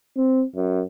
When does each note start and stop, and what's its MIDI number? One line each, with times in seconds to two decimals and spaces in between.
0.17 0.44 60
0.55 0.82 42